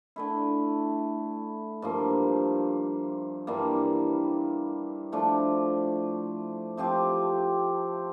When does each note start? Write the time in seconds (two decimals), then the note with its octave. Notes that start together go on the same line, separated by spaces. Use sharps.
0.16 D3 A3 E4
1.82 G2 F3 A#3
3.47 G2 E3 G3 A#3
5.12 F3 A3 D4
6.77 C3 F3 C4 G4